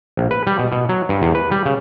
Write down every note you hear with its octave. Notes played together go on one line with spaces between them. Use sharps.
A#1
B4
G3
B2
B2
F#3
G2
E2
B4
G3
C#3